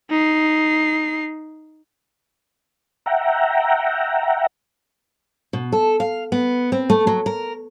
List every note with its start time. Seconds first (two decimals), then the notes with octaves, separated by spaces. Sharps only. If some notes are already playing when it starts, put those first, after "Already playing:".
0.11 D#4 C7
3.06 E5 F#5 G5 A#5
5.53 B2
5.72 A4
6.00 F5
6.32 B3
6.72 C4
6.90 A3
7.07 F#3
7.26 A#4